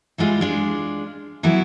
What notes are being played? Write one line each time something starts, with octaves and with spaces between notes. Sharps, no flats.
E3 G3 G#3 F4
G#3 D4 F4
E3 F#3 B3 E4